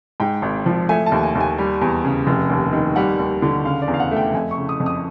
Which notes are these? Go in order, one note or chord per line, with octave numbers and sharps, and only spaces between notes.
G#2 G5
G#1
F3
A3 G#5
A5
D#2
G#5
D#2
G#5
G3
E2
C#3
F1
D#2
D#3
G3 F#5
D#2
D3
C#3 F5
D5
E2
F5
F#5
A3
G5
F2 G#5
C#6
C#3
D#6
F2
D#6